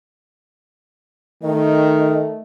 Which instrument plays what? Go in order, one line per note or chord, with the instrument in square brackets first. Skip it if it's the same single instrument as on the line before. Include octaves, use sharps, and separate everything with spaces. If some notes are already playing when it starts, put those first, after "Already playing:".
[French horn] D#3 [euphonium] A3 [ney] D#5